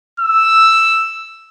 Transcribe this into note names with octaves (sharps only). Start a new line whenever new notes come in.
E6